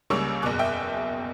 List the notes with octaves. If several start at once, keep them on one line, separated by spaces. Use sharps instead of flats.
C#2 C#3 G3 A#3 C#6 E6
F#1 E2 B2 D6 F#6
E5 G5